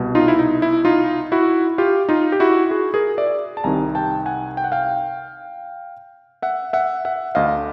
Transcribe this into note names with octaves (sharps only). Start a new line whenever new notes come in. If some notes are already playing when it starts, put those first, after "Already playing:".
Already playing: C2 B2
D#4 F4
E4
D#4
E4
D#4 F4
E4 F#4
F4 G4
D#4 F4
G4
E4 F#4
F#4 G#4
G#4 A#4
D5 E5
A5
C2 C3 D#3 G#5 A#5
G5 A5
F#5 G#5
G5
F#5
F5 G5
E5 F#5
E5 F#5
E5 F#5
D2 D3 D#5 F5